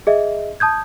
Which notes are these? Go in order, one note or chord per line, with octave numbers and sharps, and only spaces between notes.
G#4 D#5 E5
A5 D#6 G6 G#6